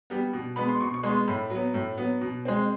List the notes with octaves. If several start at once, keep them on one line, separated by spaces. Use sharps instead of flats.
G3 B3
B2
G#3 B3 B5
C6
B2 C#6
C#6
G#3 B3 C6
A2 B5
F#3 B3
A2
F#3 B3
B2
G#3 C4